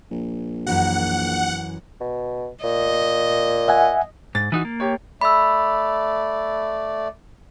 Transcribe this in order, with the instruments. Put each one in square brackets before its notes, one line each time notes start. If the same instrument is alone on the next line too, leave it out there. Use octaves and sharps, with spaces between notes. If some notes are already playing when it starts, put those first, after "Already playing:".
[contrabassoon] A#1
[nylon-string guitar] F#2 E3 F#4 [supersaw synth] F#5
[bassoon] B2
[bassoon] A#2 [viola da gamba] D#5
[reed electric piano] E5 F#5 G#5
[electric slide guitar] G#2 [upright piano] A6
[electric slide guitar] E3 D#4 F#4
A#3
[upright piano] G4 C#5
[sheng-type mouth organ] A3 D5 [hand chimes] B5 E6